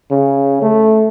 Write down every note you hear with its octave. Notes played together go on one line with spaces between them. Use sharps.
C#3
A3